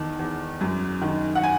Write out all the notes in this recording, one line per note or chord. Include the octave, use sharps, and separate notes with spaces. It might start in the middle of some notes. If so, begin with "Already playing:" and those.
Already playing: E2 D#3 A5
E2
F#2
D#3
F#5
G#5